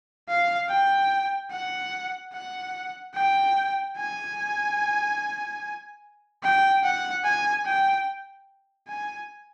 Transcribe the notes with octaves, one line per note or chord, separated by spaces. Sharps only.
F5
G5
F#5
F#5
G5
G#5
G5
F#5
G#5
G5
G#5